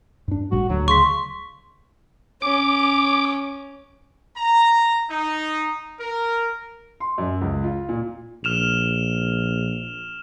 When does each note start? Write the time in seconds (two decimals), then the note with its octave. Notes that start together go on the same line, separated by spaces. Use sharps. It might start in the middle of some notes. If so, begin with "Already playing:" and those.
0.28 G2 D4
0.52 G#1 A2 G3 F#4
0.70 D2 D3 F#3
0.88 C#3 C6 C#6 B6
2.42 C#4 D6
4.37 A#5
5.09 D#4
5.99 A#4
7.00 C6
7.18 F#2
7.41 C#2
7.64 F4
7.89 A#2
8.44 A#1 F6 E7 F7